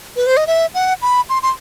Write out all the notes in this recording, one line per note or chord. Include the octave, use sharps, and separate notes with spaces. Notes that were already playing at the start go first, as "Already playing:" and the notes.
B4
C5
D#5
E5
F#5
B5
C6
C6